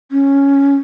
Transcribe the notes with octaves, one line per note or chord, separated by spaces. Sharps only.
C#4